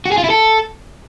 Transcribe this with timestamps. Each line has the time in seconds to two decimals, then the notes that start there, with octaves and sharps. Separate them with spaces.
0.05 F#4
0.12 G#4
0.18 F4
0.24 E4
0.30 A4